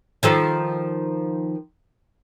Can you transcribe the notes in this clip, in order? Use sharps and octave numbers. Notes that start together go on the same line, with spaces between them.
D#3 F3 A4